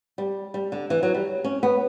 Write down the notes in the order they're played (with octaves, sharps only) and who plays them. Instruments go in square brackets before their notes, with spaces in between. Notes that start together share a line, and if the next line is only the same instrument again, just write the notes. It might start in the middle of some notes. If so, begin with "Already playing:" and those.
[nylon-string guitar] G3
G3
D3
E3
F#3
G3
C#4
B3